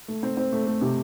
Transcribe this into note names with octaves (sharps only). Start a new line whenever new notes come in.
A3
C4
C4
A3
A3
C3